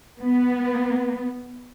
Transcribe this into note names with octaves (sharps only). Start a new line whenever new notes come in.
B3